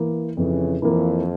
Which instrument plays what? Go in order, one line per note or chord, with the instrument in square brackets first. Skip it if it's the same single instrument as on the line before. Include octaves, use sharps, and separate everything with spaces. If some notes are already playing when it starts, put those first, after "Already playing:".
Already playing: [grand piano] E3 A#3
[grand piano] F2 [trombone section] C#3 E3
[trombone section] F2 [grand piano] E3 A#3